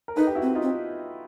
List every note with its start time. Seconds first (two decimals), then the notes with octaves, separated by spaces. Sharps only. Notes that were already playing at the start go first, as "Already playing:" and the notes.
0.08 A#4
0.16 D#4 A4 B4
0.27 G4
0.35 E4 F#4
0.42 C4
0.55 D#4 F4
0.62 C4